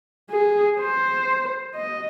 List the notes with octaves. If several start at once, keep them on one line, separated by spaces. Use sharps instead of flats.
G#4
C5
D#5